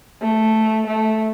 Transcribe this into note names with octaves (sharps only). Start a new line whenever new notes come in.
A3
A3